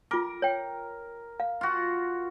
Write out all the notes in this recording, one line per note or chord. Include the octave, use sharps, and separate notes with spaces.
F4 A#4 D6
C#5 G5
F5
F4 F#4